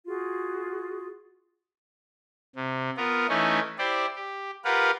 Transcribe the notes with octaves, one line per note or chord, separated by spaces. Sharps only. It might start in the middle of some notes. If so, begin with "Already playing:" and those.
F4 F#4 G#4
C3
B3 F4 A#4
E3 A3 C#4 D#4 E4
E4 G4 C5 D5
G4
F4 G4 A#4 B4 F5 F#5